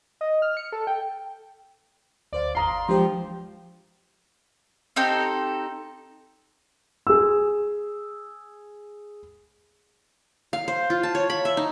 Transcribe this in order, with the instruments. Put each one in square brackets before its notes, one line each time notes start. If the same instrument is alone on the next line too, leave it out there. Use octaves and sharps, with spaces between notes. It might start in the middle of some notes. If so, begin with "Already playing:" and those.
[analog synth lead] D#5
F6
C#7
A4
G5
[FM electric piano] D2 C5 F5 [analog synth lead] D5
[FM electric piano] G1 D#2 [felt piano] F5 A#5 D#6 [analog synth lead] C6
[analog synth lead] F3 [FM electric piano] G#3 D4 C5 [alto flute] G4
[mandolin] C4 D#4 G4 A4
[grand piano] G#4 E6
[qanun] F5
C5
F4
A5
C#5
B5
E5
D#4